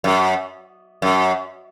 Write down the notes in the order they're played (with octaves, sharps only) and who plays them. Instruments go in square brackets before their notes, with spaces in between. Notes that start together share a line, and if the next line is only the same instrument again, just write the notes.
[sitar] F#2
F#2